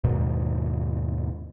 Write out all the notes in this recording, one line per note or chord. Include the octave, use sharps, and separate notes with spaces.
D#2 G#2 B2 D#3